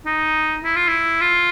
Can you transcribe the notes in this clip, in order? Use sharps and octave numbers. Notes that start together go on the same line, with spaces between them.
D#4
E4
F4
E4
F4